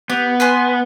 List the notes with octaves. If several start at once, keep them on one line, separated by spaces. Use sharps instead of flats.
B3 G4
B4 G#5 C6